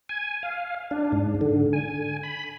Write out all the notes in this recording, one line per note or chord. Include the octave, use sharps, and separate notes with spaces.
G#5
F5
D4
G#2
D3
G#5
B5